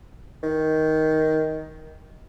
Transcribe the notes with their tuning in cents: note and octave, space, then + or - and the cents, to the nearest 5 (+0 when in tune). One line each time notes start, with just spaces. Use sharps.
D#3 +10